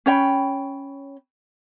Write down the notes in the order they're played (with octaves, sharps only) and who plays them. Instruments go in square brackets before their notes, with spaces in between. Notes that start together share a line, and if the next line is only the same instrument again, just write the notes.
[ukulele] C#4 C#5 G5 B5